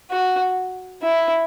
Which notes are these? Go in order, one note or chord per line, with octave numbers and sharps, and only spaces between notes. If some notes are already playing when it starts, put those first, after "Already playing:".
F#4
E4